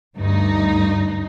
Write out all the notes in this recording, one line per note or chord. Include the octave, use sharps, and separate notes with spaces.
D2 G2 D#4